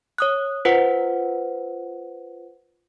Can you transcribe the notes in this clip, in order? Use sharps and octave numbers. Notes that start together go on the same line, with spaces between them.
C#5 D#6 F#6
F4 B4 C5 F#5